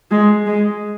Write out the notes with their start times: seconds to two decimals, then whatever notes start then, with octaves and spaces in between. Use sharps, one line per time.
0.11 G#3
0.46 G#3